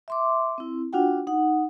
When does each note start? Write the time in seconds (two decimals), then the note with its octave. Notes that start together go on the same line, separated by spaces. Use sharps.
0.08 E5 C6 D6
0.58 C4 E4
0.93 D4 F4 F#4 F#5 G5
1.27 D#4 F#5